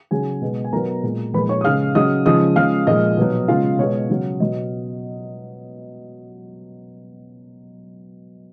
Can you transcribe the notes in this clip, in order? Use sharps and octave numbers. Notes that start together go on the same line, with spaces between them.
C#3 F#3 G#4 G#5
B2 G#3
G#5
B2 F#3 A#4 A#5
A#2 G#3
A#2 F3 G#3 B4 B5
C#5 C#6
D#6
C#3 G#3 F5 F6
C#3 F#3 D#5 D#6
C#3 F3 G#3 D#5 D#6
C#3 F3 G#3 F5 F6
A#2 F3 G#3 D#5 D#6
B2 F#3
C#3 G#3 F4 F5
B2 G#3 C#5
C#3 F#3
B2 F#3 D#5